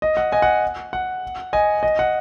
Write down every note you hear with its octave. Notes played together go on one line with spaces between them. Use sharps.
D#5
F#5
D#5 G#5
F#5
F#5
D#5 G#5
D#5
F#5